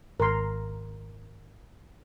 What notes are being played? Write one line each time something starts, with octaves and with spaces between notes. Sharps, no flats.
G#1 A#4 C6